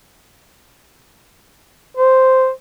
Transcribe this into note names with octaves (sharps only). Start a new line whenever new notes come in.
C5